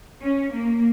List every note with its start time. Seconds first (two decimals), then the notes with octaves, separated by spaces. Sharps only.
0.22 C#4
0.53 A#3